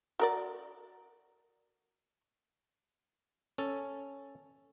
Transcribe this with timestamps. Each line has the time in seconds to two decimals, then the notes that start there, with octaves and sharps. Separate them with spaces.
0.20 F#4 A#4 D5
3.58 C#4 A4